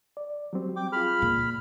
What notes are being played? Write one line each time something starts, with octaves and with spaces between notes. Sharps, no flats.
D5
F#3 G3 C4
G5 D6
F4 G#4 B5 F6
A#2